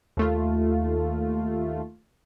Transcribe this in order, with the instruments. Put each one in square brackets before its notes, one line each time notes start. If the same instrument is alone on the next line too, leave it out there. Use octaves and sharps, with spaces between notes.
[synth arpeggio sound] D#2 A3 F4